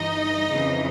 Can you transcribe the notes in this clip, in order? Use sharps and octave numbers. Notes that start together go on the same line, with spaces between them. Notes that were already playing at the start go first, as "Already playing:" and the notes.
Already playing: G1 G2 E3 D#4 D#5
F2 C#3 E3